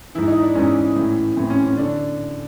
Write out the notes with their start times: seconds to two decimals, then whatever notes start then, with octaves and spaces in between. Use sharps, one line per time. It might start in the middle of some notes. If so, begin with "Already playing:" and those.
0.15 G#2 E3 E4
0.28 D#4
0.42 D4
0.55 G#2 E3 C#4
0.96 A2 E3
1.37 A2 E3 C4
1.50 C#4
1.64 C#4
1.77 D3 D4